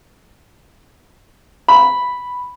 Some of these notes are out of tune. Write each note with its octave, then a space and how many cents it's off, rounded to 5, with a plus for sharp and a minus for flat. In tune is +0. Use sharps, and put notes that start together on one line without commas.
B5 +0